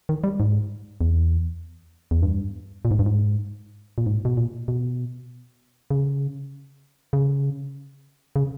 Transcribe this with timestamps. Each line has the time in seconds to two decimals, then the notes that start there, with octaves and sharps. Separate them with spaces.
0.09 D#3
0.24 G3
0.40 G#2
1.01 E2
2.11 E2
2.22 G2
2.85 A#2
2.91 G#2
2.99 G2
3.06 G#2
3.98 A#2
4.06 G#2
4.25 B2
4.37 A#2
4.68 B2
5.91 C#3
7.13 C#3
8.36 C#3